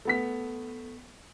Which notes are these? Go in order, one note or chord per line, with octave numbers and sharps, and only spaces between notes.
A3 B3 B6